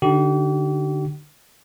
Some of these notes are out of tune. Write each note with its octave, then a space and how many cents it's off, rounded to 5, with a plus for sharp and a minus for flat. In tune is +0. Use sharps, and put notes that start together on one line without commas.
D3 +0 D#4 -15 G4 -40